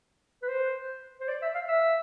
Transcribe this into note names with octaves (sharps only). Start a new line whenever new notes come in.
B4
C5
C5
D5
E5
F5
E5